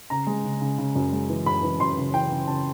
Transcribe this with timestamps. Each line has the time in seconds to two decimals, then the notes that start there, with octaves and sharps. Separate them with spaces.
0.10 C#3 A#5
0.27 G#3
0.44 C#3
0.61 C#3
0.78 C#3
0.95 F#2
1.13 G#3
1.29 E3
1.46 F#2 B5
1.63 E3
1.80 F#2 C6
1.98 C#3
2.13 E3 G5
2.31 C#3
2.47 C#3 A5